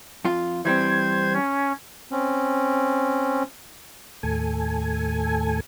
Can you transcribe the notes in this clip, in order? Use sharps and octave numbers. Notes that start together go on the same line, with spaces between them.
F2 F4
E3 G3 C4 C5 G#6
C#4
C4 C#4
D#2 A2 A4 G#5